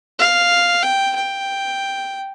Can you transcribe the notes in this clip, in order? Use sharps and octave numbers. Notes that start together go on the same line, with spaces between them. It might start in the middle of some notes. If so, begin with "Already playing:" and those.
F5
G5
G5